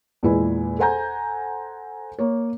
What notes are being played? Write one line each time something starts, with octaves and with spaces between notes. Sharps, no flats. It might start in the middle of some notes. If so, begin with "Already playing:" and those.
E2 A#2 G#3 E4 B4 G#5
A4 C5 F#5 G#5 A#5 G6
A#3 C#5